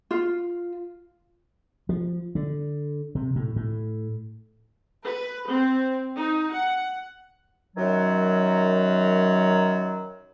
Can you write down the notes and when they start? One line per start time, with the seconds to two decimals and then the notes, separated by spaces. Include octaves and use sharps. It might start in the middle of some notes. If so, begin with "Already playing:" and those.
0.11 F4
1.89 F3
2.35 D3
3.15 C3
3.36 A2
3.56 A2
5.03 B4
5.48 C4
6.16 D#4
6.51 F#5
7.77 F#2 D#3 F#3